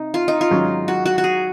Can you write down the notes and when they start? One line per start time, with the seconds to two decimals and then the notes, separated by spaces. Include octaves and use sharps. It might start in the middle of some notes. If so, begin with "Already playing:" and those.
Already playing: C3 D#4
0.14 F4
0.28 D#4
0.41 F4
0.51 G#1 G#2 F#3 C#4
0.88 F#4
1.06 F#4
1.18 F#4
1.24 G#4